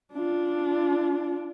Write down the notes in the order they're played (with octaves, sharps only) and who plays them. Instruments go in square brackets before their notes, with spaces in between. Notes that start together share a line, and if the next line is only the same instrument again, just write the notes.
[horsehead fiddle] D4 F4